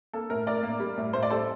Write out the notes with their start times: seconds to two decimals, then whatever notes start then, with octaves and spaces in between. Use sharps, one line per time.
0.13 A#3 A4
0.30 A2 A#4
0.46 A2 A#4 D5
0.63 A#3
0.80 G3
0.98 A2
1.13 A2 C5
1.23 D5
1.30 G3 A4 C5